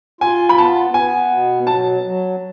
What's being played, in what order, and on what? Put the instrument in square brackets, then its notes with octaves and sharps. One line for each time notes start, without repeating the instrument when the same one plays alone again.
[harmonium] F4 [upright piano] G#5
[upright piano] B5
[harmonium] B3 [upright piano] A5
[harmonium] B3 [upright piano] G#5
[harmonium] B2
[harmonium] F#3 [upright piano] A5
[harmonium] F#3